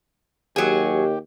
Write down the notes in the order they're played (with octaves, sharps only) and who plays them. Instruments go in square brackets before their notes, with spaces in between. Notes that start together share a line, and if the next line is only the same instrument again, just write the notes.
[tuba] D#2 [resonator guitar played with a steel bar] F#3 G#4 [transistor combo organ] G4